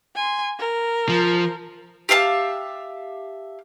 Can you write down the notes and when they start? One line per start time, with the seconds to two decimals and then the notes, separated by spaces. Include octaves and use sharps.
0.15 G#5 C6
0.59 A#4
1.09 F3
2.09 G4 E5 F5 A5